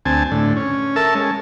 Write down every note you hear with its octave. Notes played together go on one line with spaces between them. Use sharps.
D2 C4 G#5 A5
A2 D3
C#4
A4 A#4 E5 A5
G#3 C#4